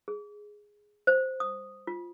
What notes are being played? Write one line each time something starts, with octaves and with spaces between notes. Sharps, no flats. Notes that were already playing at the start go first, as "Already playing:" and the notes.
G#4
C5
D#6
F4